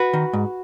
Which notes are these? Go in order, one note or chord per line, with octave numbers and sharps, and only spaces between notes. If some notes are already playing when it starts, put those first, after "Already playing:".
Already playing: F#4 B4
D#3
G#2